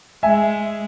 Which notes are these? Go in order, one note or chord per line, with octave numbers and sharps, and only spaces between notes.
G#3 E5 G#5